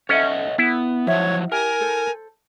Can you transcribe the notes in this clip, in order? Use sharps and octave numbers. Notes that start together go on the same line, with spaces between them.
C#4 A4 C5 C#5 D#5 E5 F#5
B3 E4
F3 F#3 F#4 C#5 D#5 E5
G4 A#4 G#5
A4 C5